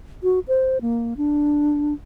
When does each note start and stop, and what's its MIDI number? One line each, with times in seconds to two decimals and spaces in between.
0.23 0.39 66
0.48 0.81 72
0.81 1.14 58
1.17 1.94 62